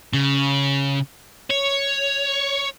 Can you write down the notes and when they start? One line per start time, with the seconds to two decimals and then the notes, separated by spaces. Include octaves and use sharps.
0.13 C#3
1.50 C#5